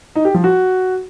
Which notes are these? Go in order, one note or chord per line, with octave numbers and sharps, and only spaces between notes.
D#4
G4
F3
F#4